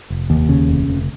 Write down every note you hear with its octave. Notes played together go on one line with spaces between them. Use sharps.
F1
D#2
C#3
F1
F1